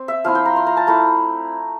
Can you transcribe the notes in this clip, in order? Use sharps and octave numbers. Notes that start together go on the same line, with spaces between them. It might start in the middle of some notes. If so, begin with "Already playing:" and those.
Already playing: C4
E5
F3 C4 E4 F5
G5
A#5
C6
A#5
A5
A3 E4 A#5